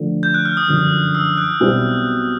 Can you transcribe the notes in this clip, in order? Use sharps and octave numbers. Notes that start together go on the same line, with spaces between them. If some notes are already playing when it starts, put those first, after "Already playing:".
Already playing: D3 F3 A3
G6
F#6
F6
D#6
G1 F#2 D3 F3
E6
F#6
B1 B2 G3 C4 E4